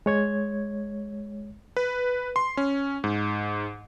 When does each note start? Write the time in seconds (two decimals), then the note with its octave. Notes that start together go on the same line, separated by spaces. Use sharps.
0.06 G#3 C#5 G#6
1.77 B4
2.36 C6
2.57 C#4
3.04 G#2